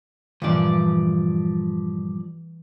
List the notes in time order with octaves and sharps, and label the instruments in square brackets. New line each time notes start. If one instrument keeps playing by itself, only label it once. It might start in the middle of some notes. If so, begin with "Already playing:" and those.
[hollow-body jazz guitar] G2 A#2 [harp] E3 G3 D4 [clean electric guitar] F3 D5